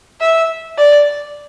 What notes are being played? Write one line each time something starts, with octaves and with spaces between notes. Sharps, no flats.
E5
D5